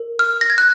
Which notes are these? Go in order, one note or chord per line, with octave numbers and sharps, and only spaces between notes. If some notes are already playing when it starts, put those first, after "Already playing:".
Already playing: A#4
F6
A#6
G#6
F#6